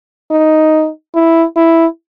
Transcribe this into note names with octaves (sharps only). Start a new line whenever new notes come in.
D#4
E4
E4